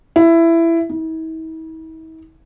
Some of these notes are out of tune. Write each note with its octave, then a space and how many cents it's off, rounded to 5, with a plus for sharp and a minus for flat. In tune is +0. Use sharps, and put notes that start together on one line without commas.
E4 +15
E4 -45